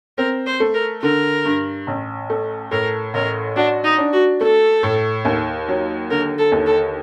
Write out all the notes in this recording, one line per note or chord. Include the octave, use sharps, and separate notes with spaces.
C4 A#4
C5
A3
A#4
D3 A#4
G2
A1
A3
A2 A#4
A1 A#4
D4 F#4
D#4
D4
F#4
A3 A4
A2
D#2
F#3
D3 A#4
A4
D#2
A4